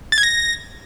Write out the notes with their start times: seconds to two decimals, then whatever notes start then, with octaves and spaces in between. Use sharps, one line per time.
0.12 A6
0.18 G#6
0.23 A#6